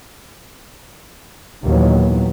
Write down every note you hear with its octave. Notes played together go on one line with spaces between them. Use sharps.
D#2 A#2 D#3 E3 F#3 B3